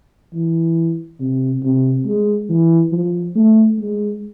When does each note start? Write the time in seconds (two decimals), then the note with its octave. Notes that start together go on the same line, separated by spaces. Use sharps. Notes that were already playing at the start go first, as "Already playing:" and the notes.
0.34 E3
1.20 C3
1.63 C3
2.06 G#3
2.49 E3
2.92 F3
3.35 A3
3.79 G#3